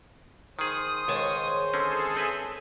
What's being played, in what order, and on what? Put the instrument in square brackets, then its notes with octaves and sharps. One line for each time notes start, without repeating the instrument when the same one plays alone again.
[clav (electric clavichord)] D#3 G#4 [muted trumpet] C5 [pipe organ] D#6
[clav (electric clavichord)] C#2 A5 [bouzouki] D#3 G#3 C#5
[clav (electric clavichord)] D3 C4 C#4 [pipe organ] G#4 A4
[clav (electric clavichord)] C4 B4 E5